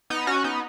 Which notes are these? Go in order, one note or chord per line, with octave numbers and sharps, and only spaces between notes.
B3 D#4
C#4 F#4
B3 D#4